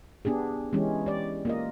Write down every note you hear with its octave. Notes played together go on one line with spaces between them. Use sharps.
B3 D4 G4 G#4
E3 G#3 C#4 G4
G4 D5
A#3 F4 D#5